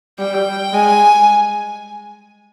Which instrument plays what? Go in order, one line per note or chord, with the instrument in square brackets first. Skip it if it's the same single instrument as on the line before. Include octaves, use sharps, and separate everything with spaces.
[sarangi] G3 [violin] G5
[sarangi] G#3 [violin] G#5